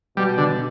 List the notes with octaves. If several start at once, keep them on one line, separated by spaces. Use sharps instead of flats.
B2 G3
D3